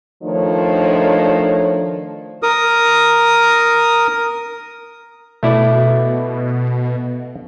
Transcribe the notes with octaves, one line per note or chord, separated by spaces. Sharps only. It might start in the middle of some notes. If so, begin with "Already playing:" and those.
D#3 F3 A3 D4 C#5
A#4 D#6
B2 A3 E4 D5